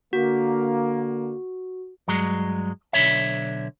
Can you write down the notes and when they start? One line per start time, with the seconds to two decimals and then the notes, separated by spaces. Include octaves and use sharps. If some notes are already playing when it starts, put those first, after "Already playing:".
0.13 D3 A#3 F#4
2.08 G2 F#3 G#3
2.93 B1 D3 E3 C#5 E5